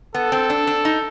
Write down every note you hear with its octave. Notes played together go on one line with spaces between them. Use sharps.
B3 A4
C4
D4
D4
D#4